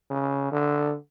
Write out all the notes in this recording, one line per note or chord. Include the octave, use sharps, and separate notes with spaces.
C#3
D3